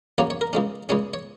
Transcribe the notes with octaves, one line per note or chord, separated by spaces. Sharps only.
F#2 C#3 F#3 A#3 C#4 C#5
C#5
A#4
C#2 C#3 G#3 C#4
C#2 C#3 G#3 C#4 C#5
C#5